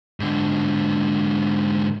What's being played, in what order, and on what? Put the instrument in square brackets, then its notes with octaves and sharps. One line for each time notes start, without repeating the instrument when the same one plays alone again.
[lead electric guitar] G#2 D3